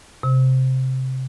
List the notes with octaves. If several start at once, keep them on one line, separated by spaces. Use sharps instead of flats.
C3